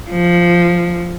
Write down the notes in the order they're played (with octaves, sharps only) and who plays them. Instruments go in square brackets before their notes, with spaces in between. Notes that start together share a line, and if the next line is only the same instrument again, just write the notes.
[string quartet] F3